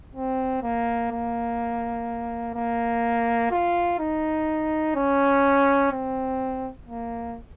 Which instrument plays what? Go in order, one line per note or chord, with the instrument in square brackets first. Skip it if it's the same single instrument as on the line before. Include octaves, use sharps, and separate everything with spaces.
[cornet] C4
A#3
A#3
A#3
F4
D#4
C#4
C4
A#3